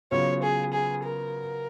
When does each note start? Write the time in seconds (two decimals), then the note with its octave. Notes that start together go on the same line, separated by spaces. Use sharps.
0.11 C#3 F#3 B3 F4 C#5
0.42 G#4
0.73 G#4
1.04 A#4